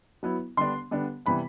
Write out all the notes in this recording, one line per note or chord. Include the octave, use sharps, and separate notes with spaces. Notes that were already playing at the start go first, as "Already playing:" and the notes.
F#3 B3 E4
D3 G3 B3 D4 C6
D3 G3 B3 D4
C3 E3 G3 B3 B5